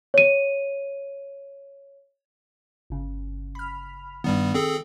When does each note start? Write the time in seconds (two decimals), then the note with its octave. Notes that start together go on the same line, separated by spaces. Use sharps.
0.14 C#5 D#7
2.90 G1 C#3
3.55 B5 F6
4.24 G2 D#3 G3 B3
4.54 C4 G#4 A4